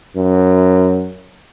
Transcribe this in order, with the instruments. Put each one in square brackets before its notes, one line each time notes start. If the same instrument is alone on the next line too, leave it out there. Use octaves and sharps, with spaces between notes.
[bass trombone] F#2